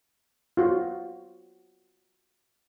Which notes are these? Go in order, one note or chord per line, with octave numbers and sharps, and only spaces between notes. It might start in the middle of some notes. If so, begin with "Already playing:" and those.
F4 F#4